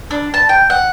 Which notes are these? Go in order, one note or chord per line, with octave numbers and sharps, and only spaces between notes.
D4
A5
G5
F#5